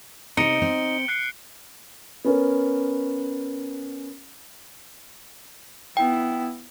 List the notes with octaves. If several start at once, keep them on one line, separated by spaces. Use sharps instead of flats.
C3 C4 D#4 C#7 D7 G7
C4
F#6 C7 C#7
B3 C#4 A#4
B3 E4 G5